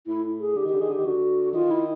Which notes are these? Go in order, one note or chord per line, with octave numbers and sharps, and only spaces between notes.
A2 E4
G#4
D3 G4
D#3
D3 G4
D#3 G#4
D3
G4
D#3
D3 F#4
D#3 F4
E4